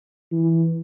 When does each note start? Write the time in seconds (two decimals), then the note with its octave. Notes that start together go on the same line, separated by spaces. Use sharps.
0.32 E3